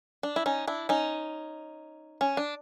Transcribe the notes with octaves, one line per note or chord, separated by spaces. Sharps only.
D4
E4
C#4 D#4
D4 E4
C#4 D#4
C#4
D4